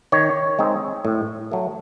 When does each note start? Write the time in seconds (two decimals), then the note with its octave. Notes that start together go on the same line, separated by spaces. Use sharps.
0.12 D#3 C#5
0.59 G#3 C4 D#4
1.05 A2
1.52 F#3 A3